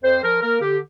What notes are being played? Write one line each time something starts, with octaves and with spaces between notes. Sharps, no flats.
F2 C5
F3 A#4
A#3 A#4
D3 G4